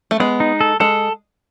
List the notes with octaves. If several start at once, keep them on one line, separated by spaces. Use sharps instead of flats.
A3
G#3 B3
D#4
A4
G#3 A4